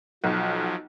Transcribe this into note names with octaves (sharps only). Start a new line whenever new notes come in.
B1 F3 F#3